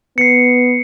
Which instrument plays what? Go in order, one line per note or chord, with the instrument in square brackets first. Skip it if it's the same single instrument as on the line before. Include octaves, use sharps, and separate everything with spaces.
[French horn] B3 [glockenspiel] C7 C#7